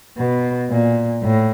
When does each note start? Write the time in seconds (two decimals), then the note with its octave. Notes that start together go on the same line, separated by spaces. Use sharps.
0.18 B2
0.70 A#2
1.23 A2